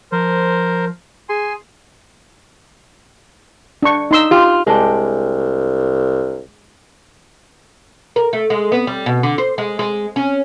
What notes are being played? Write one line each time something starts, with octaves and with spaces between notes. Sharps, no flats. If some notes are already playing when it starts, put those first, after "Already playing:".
F3 A#4 C5
G#4 G#5 C6
D4 C#6
D#4 C6 E6
F4 G4
C2 G#3 D4 G5
A#4
A3
G#3
B3
G3
B2
D3
C5
G#3
G#3
C#4